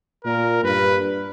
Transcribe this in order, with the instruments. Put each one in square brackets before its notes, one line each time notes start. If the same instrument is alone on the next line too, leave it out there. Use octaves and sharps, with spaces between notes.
[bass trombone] A#2 [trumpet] A#4
[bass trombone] G2 [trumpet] B4